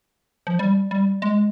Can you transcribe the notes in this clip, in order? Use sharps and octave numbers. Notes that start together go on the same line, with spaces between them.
F3
G3
G3
G#3